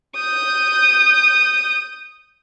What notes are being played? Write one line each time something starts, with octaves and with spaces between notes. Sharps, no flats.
D#6 G6